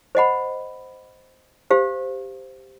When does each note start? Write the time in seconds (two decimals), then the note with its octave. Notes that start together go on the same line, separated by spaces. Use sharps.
0.15 C5 D#5 F#5 B5
1.70 G4 C5 F5